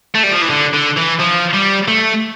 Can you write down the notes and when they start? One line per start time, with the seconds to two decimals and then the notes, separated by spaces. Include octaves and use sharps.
0.14 A3
0.23 G3
0.32 F3
0.42 E3
0.49 D3
0.73 D3
0.97 E3
1.19 F3
1.53 G3
1.88 A3